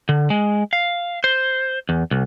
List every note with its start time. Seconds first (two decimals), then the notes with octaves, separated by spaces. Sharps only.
0.09 D3
0.30 G#3
0.73 F5
1.24 C5
1.89 E2
2.11 C2